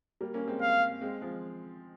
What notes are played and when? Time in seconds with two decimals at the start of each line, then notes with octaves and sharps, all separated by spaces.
0.21 G3 A#3
0.34 A#3 C#4
0.48 G#3 C4
0.61 F5
1.01 G#3 C4
1.21 F3 G#3